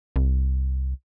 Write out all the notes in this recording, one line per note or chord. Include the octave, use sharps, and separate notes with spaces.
C2